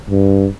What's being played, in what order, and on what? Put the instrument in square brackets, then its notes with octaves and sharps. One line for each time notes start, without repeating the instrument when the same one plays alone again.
[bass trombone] G2